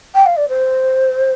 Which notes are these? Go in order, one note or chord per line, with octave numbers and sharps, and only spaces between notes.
G5
F5
D5
C5